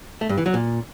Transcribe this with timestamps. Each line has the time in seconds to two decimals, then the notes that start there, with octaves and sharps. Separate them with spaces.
0.21 A3
0.29 G2
0.38 E3
0.46 F#3
0.54 A#2